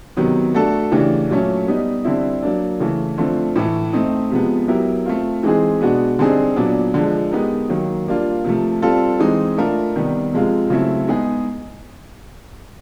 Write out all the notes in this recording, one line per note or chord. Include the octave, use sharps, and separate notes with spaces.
C3 D#3 F#3 B3
A3 D4 F#4 A4
C#3 E3 A3 D4 G4
A#2 F#3 A3 C#4
G3 B3 D#4
D3 G3 C4 E4
F#3 A#3 D4
C#3 E3 A3
D3 F3 A3 C4
A2 E3 A3
A3 C4 D#4
C3 F3 G#3 B3
F#3 B3 E4 G4 A#4
A3 C4 F4
E3 G#3 C4 D#4 G#4
B2 G#3 B3 D4 F#4
D3 G3 C4 D#4 G#4
A#2 F#3 B3 D4
D3 F3 G#3
G#3 B3 D#4 G4 A#4
D#3 F#3 A#3
G3 A#3 D4 F4
C3 F3 A3
G3 C4 F4 A4
E3 G#3 C4 D#4
A3 D4 F4 A#4
C3 D#3 G3 B3
C3 F3 G#3 C4 F4
C#3 F#3 A3 C4 E4
G#3 B3 D#4 G#4